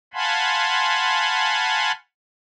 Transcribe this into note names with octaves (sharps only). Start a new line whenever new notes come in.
F5 F#5 G#5 A5 B5 C6